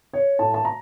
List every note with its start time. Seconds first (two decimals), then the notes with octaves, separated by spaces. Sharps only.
0.13 C#5
0.39 A2 A3 A5
0.54 A5
0.65 A#5